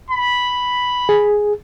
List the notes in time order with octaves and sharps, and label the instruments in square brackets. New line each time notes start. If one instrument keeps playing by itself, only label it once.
[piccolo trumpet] B5
[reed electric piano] G#4